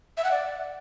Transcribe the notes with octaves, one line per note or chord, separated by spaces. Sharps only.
E5
F#5
D5